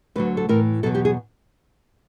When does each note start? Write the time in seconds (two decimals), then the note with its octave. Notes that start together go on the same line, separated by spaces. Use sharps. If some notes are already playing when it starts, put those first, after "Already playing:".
0.15 D2 D3 F#3 B4
0.37 A4
0.49 A2 E3 A#4
0.83 E2 B2 F#3 A4
0.95 G4
1.05 G#4